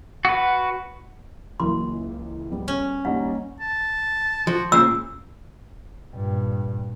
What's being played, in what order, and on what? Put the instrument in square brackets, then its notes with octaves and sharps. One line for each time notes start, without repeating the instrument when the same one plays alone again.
[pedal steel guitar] F#4 B4
[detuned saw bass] C#2 [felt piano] E3 F#3 A#3 [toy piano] C6
[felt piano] G3 B3
[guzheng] C#4
[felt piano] D#2 D#4 A#5 [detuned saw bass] G3 [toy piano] F#5
[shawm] A5
[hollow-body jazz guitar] F3 [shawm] F#4
[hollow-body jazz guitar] A#2 C#3 A#3 [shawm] C5 [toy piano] E6
[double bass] G2 A#2